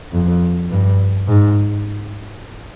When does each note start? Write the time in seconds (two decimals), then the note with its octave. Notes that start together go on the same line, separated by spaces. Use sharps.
0.12 F2
0.70 G2
1.28 G#2